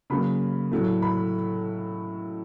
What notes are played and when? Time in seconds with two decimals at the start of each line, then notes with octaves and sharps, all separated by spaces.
0.10 C#3 F#3 A#3 B5
0.71 A2 F#3 A3
1.02 B5